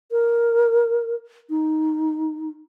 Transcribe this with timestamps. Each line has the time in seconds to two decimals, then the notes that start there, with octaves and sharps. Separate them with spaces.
0.11 A#4
1.50 D#4